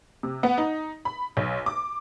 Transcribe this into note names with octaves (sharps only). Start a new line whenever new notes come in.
C3
B3
D#4
B5
B1
D6